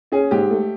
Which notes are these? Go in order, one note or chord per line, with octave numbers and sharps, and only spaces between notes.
C#4 G#4
G#2 G4
A3